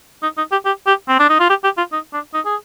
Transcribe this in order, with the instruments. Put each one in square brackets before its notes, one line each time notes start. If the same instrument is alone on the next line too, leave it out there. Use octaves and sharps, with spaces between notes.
[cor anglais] D#4
D#4
G4
G4
G4
C4
D4
D#4
F4
G4
G4
F4
D#4
D4
D#4
G#4